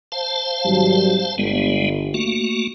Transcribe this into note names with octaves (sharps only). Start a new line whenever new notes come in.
C5 F5 A5
G#1 F#3 G3
G1 G3 G#3 B3
A3 A#3 F#4